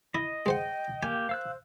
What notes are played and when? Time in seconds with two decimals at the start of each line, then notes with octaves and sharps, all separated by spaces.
0.15 E4 D#5
0.46 G#3 C5 F#5 G5
1.03 A#3 G4 G#5
1.29 C5 F5 E6 F#6